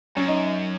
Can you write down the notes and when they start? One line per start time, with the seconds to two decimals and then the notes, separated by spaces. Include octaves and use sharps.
0.17 F#2 C#4
0.28 D#4